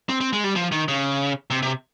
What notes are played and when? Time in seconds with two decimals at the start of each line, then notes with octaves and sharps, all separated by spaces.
0.09 C4
0.20 C4
0.33 G#3
0.44 G3
0.56 F3
0.72 D#3
0.88 C#3
1.50 C3
1.62 C3